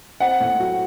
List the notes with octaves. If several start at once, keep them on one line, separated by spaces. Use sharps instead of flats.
C4 F#5
A2
F#3